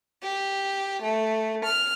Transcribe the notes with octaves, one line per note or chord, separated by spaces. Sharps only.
G4
A3
F6